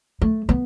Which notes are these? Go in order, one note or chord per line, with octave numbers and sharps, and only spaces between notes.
A3
B3